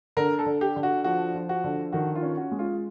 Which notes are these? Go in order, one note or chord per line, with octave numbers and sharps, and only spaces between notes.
D3 A#4
A4
D3
G4
D3
F#4
F3 F#4
F3
F#4
D3
D#3 F#4
F4
C#4
F#4
G#3
F4